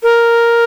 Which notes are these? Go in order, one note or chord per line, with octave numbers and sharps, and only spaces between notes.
A#4